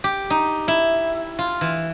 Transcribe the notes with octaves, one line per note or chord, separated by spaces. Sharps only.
G4
D#4
E4
F4
E3